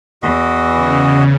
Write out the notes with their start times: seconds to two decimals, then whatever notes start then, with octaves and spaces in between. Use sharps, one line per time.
0.23 E2 E3 F#4 D#5
0.77 C#3